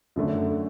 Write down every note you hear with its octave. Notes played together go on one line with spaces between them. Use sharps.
F#2 D3 A3 D4